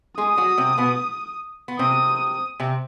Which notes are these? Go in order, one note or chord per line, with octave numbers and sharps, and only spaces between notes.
G#3 G#4 D#6
F#3 F#4
C3 C4
B2 B3
B3
C3 C4 D#6
C3 C4